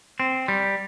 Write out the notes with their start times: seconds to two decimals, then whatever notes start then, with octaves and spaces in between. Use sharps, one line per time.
0.20 C4
0.48 G3